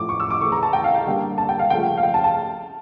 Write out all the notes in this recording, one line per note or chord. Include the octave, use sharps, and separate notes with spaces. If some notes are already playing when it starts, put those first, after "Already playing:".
Already playing: A2 F3 A3 D6
C#6
E6
D6
C#3 E3 A3 C#6
A#5
A5
G5
F5
G5
D3 G3 A#3
A5
G5
F5
C#3 F3 A3 G5
F5
G5
A5
A5